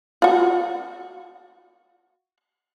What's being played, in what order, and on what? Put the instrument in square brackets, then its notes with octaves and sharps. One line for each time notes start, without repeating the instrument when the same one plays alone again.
[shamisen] F4 F#4